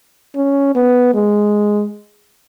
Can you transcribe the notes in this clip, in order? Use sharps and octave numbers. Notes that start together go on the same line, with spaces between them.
C#4
B3
G#3